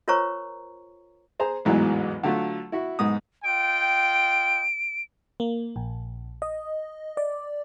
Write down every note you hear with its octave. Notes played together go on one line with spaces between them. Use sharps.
F4 A#4 C5 C#5 A#5 C#6
G#4 C5 A#5
A1 E2 G#2 E3 F#3 G#3
D3 F#3 A3 F4
E4 F#4 E5
B1 G#2 D#6
F4 D#5 G5 D7
A#3
A#1
D#5
D5